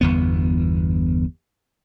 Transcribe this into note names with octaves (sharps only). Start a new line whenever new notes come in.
G1 E2 B3